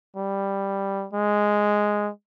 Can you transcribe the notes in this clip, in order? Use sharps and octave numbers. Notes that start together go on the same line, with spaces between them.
G3
G#3